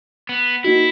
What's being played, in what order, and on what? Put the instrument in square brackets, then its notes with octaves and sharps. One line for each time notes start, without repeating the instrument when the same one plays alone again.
[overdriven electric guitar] B3
[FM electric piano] A#3 D#4 F#4 [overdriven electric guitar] E4